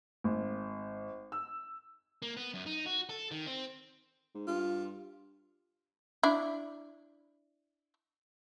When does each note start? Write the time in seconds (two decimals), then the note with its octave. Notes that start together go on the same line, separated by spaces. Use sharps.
0.24 G#1
1.32 E6
2.22 A#3
2.37 B3
2.54 F#2
2.66 D#4
2.86 F#4
3.09 A4
3.31 D#3
3.46 C4
4.34 G#2
4.47 G2 F4
6.23 D4 E4